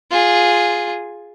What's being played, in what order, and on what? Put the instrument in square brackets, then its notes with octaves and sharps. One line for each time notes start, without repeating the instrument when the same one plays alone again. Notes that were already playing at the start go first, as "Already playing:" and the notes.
[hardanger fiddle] F4 G#4